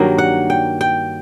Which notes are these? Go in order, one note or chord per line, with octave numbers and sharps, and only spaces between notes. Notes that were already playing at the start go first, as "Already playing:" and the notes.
Already playing: G2 D#3 F#3 A#3
F#5
G5
G5